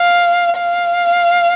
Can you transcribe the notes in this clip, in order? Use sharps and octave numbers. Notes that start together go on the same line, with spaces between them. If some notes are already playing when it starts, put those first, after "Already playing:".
Already playing: F5
F5